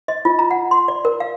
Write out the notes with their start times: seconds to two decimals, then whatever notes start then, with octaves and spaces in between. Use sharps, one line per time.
0.08 D#5
0.25 F4
0.39 A#5
0.51 F#5
0.71 C6
0.88 D5
1.05 A#4
1.20 F5